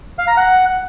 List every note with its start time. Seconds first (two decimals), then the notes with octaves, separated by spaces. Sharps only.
0.18 F5
0.28 A#5
0.37 F#5